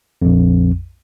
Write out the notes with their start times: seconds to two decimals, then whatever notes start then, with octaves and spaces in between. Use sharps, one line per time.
0.22 A#1 F2